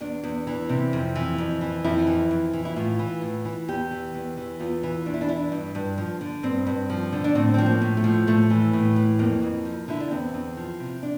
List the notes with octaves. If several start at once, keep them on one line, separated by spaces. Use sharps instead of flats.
E2 D4
E2
E3
C3
F2
E3
F2
E3
F2 E4
E3
F2
E3
E4
A2 F4
E3
A2
E3
E2 G4
E3
E2
E3
E2 F4
E3
E2 D4
E4
D4
E3 E4
D4
G2 D4
G2
F3
D3
G2 C4
G2
F3
D3
D4
A2 C4
F3 C4
A#3
A2
A3
F3
A2 A3
E3
A2
E3
F2 A#3
F2
F3
D3 E4
D4
E2 C4
E2
F3
C3
D4